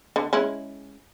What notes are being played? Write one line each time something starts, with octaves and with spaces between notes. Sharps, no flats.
D3
G#3 C#4 E4